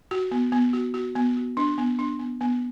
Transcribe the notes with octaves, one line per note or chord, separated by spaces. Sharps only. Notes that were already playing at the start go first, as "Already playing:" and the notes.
F#4
B3
B3
F#4
F#4
B3
F#4
D4
B3
D4
B3
B3